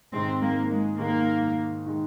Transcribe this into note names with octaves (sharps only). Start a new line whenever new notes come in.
G#2 D#3 G#3 C4
A#3
G#3
G#2 D#3 G#3 A#3
D#3 G#3